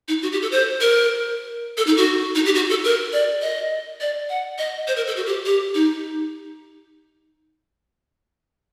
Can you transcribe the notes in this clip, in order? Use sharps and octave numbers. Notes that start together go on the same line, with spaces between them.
D#4
F#4
G4
A4
C5
A#4
A4
D#4
F#4
D#4
G4
F#4
A4
A#4
D5
D#5
D5
F#5
D#5
C5
A#4
A4
F#4
G4
G4
D#4